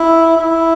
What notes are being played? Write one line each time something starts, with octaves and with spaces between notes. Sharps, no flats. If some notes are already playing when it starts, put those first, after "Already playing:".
Already playing: E4
E4